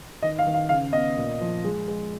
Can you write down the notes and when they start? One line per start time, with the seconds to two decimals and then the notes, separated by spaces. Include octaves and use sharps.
0.22 D#3 D#5
0.39 F5
0.46 D#3
0.54 F5
0.69 C#3 F5
0.93 B3 D#5
1.17 A#2
1.41 F3
1.64 G#3
1.88 G#3